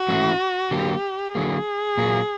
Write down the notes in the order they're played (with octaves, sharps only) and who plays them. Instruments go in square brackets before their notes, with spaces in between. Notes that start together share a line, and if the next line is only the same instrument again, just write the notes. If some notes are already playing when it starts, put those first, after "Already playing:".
Already playing: [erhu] F#4
[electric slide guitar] G#2 E3 A3 C#4 E4
[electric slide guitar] D3 F#3 A#3 [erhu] G4
[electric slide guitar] D3 F#3 A#3 [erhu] G#4
[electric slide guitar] A#2 F#3 A#3